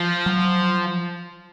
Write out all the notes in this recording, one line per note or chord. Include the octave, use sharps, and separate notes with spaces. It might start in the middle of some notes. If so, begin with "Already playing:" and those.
Already playing: F3
F#3